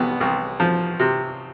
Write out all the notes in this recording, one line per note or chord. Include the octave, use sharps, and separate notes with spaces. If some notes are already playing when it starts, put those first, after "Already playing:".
Already playing: C2 B3
C2
F3
C3